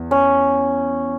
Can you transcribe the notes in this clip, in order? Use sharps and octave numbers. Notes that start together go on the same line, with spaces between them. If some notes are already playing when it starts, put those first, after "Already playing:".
Already playing: E2
C#4